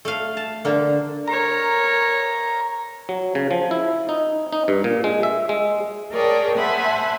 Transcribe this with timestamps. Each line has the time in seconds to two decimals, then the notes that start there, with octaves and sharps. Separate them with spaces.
0.05 A3 F5
0.37 A5
0.65 D3 A#3
1.28 A#4 C#5 A#5
3.09 F#3
3.35 C#3
3.51 F3
3.71 E4
4.09 D#4
4.53 D#4
4.68 G2
4.84 A#2
5.04 G#3
5.23 E5
5.49 G#3
6.12 G#4 A#4 C#5 D5 G5 A5
6.58 C5 E5 F#5 G#5 A5 B5